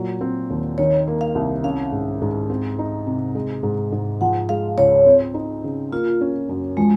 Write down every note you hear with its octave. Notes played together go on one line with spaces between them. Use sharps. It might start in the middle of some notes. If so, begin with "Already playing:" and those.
Already playing: A#2 F#3
C4
D#2
D#3 C#5
A#3
F5
C2
C#4 F5
G#2
G#2
C4
D#4
C3
G#3
G#2
G#2
F3 F#5
G#3 F5
C#2 C#5
C4
D#4
C#3
A#3 F4
C#4
F#2
F3 G#3